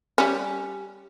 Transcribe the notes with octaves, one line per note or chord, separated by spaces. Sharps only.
G3 C#4